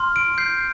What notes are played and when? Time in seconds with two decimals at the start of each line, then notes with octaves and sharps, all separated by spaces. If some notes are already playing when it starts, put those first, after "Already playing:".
Already playing: C6 F6
0.16 D7
0.38 G6 C7